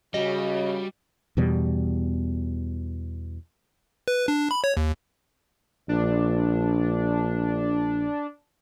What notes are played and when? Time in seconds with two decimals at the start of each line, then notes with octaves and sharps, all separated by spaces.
0.14 C#3 G3 F#4 D#5
1.37 E2 B2 G3
4.08 B4
4.28 D4
4.51 B5
4.64 C#5
4.77 D#2
5.89 A#1 D4